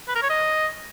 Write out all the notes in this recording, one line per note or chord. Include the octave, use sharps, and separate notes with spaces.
B4
A#4
C#5
D#5